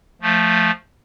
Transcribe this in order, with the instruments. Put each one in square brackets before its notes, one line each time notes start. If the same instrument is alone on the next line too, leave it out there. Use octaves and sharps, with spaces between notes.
[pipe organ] F3 A3